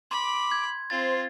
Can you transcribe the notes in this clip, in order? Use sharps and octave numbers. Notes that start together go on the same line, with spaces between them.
B5 C6 D6
G#6
C4 F4 C5 A6